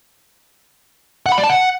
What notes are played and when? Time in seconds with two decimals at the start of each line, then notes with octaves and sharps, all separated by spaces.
1.26 F#5
1.32 B5
1.38 D5
1.43 A5
1.49 F#5